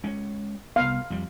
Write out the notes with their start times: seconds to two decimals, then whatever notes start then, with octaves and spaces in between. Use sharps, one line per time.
0.04 G#3 C#4
0.76 C2 B3 F5
1.10 F2 G3